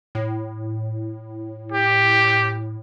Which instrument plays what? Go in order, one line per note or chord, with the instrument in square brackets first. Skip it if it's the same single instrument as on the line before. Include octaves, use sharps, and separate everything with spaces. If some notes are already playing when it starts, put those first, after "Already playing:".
[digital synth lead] A2
[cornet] G4